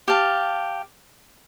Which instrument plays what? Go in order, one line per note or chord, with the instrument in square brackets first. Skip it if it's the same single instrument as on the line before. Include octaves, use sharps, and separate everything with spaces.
[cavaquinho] G4 F5 A5